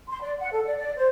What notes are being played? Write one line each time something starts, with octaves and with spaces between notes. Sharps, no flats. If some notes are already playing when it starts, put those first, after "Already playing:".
C6
D5
F#5
A4
D5
D5
C5